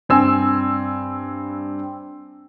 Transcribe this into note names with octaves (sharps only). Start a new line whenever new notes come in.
G2 C4 G#5 E6